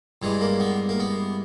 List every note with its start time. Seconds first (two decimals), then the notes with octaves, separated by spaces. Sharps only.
0.22 G2 E3 G#3
0.41 A#3
0.60 B3
0.89 A#3
1.00 B3